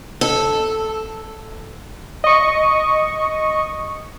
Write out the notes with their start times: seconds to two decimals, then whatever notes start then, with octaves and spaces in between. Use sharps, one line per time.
0.21 A4
2.24 D#5 C#6